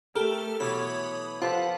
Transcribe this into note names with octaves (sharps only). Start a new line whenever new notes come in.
A3 G4 A4 A#4 F6
B2 E3 F#3 C#5 B5 D#6
F3 F4 G4 A4 B4 F#5